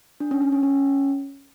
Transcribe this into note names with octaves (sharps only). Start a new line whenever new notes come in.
D4
C#4
C#4
C#4
C#4